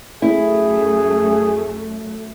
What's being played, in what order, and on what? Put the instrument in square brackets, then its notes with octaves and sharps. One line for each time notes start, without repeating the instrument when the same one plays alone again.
[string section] F#2 A3 [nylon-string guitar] E4 [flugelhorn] G#4